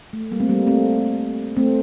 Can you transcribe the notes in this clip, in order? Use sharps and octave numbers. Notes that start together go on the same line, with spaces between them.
A3
G3 A#3
A3 C4
G3 A#3
A3 C4
A3 C4